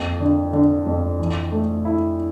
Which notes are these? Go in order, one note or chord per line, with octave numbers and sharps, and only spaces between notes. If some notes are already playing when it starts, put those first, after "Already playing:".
Already playing: F2 A#3
D3
D3
F2
E3
A3
E4